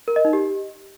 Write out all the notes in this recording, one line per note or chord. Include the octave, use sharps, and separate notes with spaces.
A#4
D#5
D#4
G4